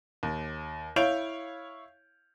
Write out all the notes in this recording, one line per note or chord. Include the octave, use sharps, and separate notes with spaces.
D#2
E4 C#5 F5 G6 D7 F7